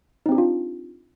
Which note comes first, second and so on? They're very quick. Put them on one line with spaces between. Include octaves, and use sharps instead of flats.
D#4 C4 G4 D4 F4